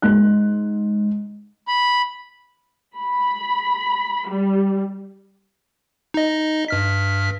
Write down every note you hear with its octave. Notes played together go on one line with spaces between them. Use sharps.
G#2 F#6
B5
B5
G3
D#4 D#5
G2 F6 B6